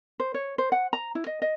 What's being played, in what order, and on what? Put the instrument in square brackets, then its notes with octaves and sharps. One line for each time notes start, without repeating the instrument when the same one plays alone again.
[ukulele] C5
C#5
C5
F#5
A#5
E4
D#5
D#5